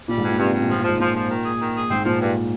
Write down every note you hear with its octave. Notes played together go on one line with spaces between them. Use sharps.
A#2 G3
G#2
G2
A#2
G2 C3
G2
A#2
G#2 F3
A#2
F3
G#2
A#2 F3
F3
D#3
G#4
D#3
G#4
G#2 C4
A#2 F3
G2